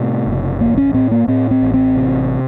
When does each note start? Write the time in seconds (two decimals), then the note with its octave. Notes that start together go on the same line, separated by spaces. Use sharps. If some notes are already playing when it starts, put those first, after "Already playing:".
Already playing: A2 C3
0.27 F#1
0.60 A1 A#3
0.78 C#4
0.94 A2 C4
1.11 A#3
1.28 A2 C4
1.51 C4
1.63 A1
1.74 C4
1.96 C3